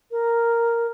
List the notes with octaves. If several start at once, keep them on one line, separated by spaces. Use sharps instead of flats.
A#4